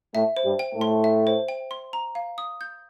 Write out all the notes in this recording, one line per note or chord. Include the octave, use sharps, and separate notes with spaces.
A2 A3 E5
C5
G2 G3
G5
A2 A3
C6
E5
C5
G5
C6
A#5
F5
D#6
G6